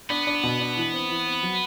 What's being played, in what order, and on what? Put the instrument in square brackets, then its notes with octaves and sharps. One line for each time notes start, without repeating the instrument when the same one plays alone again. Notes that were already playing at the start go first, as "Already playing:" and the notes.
[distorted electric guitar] B3 [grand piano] D4
[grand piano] D4
B2
D4
E3
C4
E3
C4
F#3